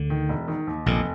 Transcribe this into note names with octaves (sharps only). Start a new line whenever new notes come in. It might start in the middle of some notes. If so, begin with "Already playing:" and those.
Already playing: D2 D3
D#3
E1
D#3
D#2
F1 A#1 A#2